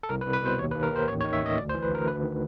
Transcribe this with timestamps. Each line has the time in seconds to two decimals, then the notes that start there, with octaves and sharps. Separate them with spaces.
0.03 A4
0.09 C2 A#4
0.21 B4
0.26 C2
0.33 B4
0.43 B2 C5
0.58 D#2 C#5
0.71 B4
0.75 D#2
0.83 A#4
0.92 D#3 C5
1.08 A1 C#5
1.21 C#5
1.24 D#3
1.33 E5
1.41 A1 D#5
1.57 D2 D5
1.69 C5
1.75 E3
1.83 B4
1.91 D2 A#4
2.07 D2 B4
2.23 D#3